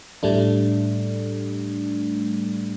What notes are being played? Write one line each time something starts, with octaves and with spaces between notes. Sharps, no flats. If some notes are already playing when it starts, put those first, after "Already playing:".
A2 G3 A3 D4